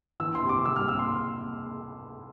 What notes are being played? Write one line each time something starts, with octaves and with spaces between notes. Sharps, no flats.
E3 E6
C6
C3
D6
G3 E6
F6
C3 E6
C6